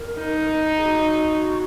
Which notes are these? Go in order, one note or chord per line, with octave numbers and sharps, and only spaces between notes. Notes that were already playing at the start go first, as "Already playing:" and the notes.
Already playing: A#4
D#4
G#4
F#4